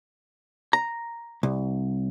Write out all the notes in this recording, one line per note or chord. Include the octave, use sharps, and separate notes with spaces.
A#5
C2